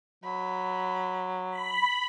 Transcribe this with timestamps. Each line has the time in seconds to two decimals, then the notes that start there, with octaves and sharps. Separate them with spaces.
0.24 F#3 B5
1.50 B5